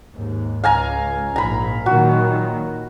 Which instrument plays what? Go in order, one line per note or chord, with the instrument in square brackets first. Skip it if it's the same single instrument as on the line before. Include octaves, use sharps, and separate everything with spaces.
[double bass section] D#2 G#2
[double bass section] C#2 [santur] F5 G#5 A#5
[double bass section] A#1 G#2 [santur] A#5 B5
[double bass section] A#2 D#3 F#3 [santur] F#4